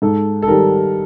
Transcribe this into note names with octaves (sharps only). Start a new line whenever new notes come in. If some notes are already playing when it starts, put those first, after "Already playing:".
G#2 A4
A4
D#3 G3 A#4